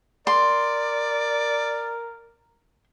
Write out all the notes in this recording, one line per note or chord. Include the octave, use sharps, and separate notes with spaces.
A#4 D5 C6